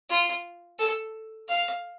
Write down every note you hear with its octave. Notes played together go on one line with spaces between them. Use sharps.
F4
A4
F5